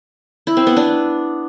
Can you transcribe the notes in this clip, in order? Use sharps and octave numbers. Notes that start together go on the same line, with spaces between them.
E4
C4
B3
D4